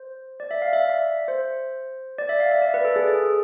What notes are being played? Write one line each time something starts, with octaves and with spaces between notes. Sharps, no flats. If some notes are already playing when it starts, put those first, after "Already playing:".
Already playing: C5
D5
E5
F5
E5
D5
E5
C5
D5
E5
F5
E5
D5
B4
A4
G#4
G#4